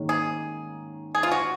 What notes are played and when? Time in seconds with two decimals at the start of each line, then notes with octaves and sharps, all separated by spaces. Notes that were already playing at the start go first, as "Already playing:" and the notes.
Already playing: G#2 D#3 A#3 C#4
0.09 G#4
1.15 G#4
1.23 F4
1.31 F#4